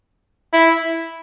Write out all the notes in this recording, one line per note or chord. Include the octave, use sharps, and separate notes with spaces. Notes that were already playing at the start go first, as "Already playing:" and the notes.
E4